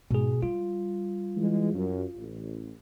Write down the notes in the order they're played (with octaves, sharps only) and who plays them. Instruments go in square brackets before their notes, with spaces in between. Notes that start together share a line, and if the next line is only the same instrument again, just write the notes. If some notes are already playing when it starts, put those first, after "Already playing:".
[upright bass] G#2 [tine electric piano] B2 G#4
[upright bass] G3 [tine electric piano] F4
[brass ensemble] E3 G#3
F#2
A1